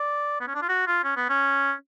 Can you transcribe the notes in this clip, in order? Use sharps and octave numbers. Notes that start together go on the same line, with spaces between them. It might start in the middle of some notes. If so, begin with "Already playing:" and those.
Already playing: D5
B3
C#4
D4
F4
F#4
F4
C#4
B3
C#4